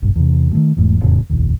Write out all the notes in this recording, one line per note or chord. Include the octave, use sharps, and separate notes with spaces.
F#1 B1 G2
E2 C3
D#3 F3 A3
E1 E2 G#2 A3
E1 F2 A2 C#3
F1 A#1 D#2